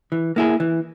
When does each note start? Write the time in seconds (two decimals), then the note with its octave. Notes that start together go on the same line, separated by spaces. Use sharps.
0.12 E3
0.36 A#3 E4 G#4
0.60 E3